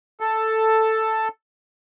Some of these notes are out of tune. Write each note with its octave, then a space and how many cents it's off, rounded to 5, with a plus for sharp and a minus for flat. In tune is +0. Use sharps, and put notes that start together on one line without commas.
A4 +5